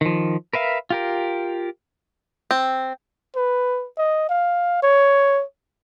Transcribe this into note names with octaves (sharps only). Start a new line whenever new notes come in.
D#3 F3
A#4 B4 E5 F5
F4 G4 A#4
C4
B4
D#5
F5
C#5